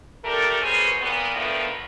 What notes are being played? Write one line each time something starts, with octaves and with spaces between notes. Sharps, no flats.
A3 D4 G4 A4 A#4
F#2 B2 B3 C#4 G#4 C5
A#2 B3
D3 D#3 F3 A3 B3